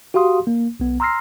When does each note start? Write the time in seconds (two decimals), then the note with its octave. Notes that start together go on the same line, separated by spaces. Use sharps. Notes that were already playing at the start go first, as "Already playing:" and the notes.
0.14 F#4 G4 F5 C6 D#6
0.47 A#3
0.80 B1 B3
1.00 A#5 C6 E6 F6 A#6 C7